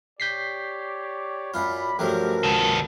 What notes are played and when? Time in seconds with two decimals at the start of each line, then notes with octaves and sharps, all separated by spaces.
0.20 G4 C#5 D5 G6 B6 C7
1.54 F#2 F4 D5 B5
1.99 G2 F3 F#3 A3 C#4 G4 A#4
2.43 C#2 D#3 A4